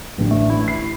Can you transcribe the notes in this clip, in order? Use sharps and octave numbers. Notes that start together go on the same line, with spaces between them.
A1 D3
A3
E4
C7